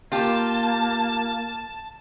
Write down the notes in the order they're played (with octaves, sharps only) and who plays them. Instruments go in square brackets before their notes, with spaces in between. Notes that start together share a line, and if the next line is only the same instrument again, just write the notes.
[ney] A#3 [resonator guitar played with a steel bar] F4 G4 [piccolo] A5